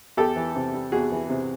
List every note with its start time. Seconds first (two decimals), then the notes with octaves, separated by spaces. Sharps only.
0.17 E2 G4 A4
0.36 E3
0.56 C3
0.73 G3
0.92 E2 F#4 G#4
1.12 E3
1.30 C3